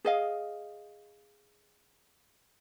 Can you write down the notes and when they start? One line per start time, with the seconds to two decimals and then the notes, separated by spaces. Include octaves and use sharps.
0.05 G#4 D#5 F5